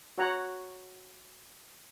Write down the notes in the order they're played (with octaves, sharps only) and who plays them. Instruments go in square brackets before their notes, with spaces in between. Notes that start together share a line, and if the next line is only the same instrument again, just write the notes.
[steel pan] F#4 C#5 F#5 A#5